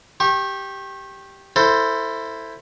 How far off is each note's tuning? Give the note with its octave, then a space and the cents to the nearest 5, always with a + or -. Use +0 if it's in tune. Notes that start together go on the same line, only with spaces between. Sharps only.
G4 +0 C#6 -35
E4 +0 A4 +20 C5 +0